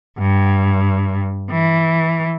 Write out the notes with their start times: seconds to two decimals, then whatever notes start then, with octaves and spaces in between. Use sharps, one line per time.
0.18 G2
1.50 E3